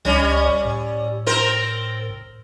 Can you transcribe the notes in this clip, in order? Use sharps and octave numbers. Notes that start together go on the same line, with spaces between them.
C#2 G3 C#4 D#5 G#5
A2
C4 A#4 C5